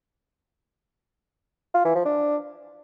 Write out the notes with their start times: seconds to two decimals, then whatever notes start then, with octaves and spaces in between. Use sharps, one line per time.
1.74 F4
1.85 E3
1.95 F3
2.05 D4